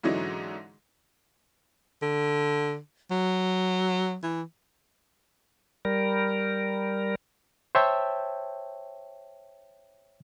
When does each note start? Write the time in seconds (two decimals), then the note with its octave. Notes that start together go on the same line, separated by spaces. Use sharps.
0.03 G#2 D3 E3 F#3 C#4 D#4
2.02 D3
3.11 F#3
4.23 E3
5.85 G3 A#4
7.75 C5 C#5 E5 G5 A5 E6